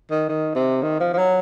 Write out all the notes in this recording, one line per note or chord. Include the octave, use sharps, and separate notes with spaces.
D#3
D#3
C3
D#3
F3
F3
F#3